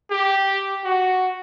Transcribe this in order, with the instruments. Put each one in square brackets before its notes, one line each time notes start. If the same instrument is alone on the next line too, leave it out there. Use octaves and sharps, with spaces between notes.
[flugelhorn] G4
F#4